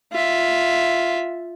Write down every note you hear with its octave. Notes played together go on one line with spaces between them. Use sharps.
F4 E5